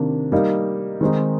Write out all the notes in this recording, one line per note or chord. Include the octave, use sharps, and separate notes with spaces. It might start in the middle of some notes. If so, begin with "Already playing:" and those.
Already playing: C3 D#3 A#3 D4
G3 A#3 D#4
D#3 G#3 C4 D#4